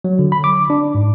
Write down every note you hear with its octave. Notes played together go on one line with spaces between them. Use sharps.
F#3
D3
B5
D6
D4
G#2